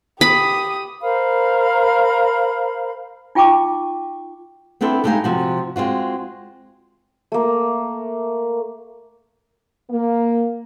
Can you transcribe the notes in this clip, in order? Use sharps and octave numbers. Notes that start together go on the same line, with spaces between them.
G4 B5 D#6
A#4 C5 F5 B5
D#4 F4 G5 A5 C#6 D6
B3 C4 D4 E4 A4
G#3 A3 D#4 G4 F5 G#5
C3 F3 F#4
G#3 C4 F4 F#4
A3 A#3
A#3